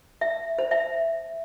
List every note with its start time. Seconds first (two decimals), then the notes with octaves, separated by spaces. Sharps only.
0.21 E5
0.59 C5
0.71 E5